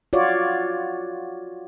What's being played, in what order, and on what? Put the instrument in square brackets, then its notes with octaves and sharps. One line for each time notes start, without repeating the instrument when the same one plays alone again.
[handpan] F4 F#4 C#5 D5